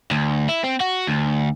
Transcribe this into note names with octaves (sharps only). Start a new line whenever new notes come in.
D2
E4
C4
F#4
D2